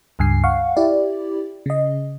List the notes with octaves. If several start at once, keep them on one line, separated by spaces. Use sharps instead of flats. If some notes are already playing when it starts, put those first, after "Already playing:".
C#2 G2 G#5 C7
F5 F#5 C#6
E4 G4 D5
C#3 D#5